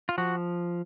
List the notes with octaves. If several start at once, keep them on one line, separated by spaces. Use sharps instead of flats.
F4
F3 F#4